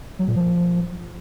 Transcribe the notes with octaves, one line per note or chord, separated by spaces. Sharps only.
F#3
A#2
F3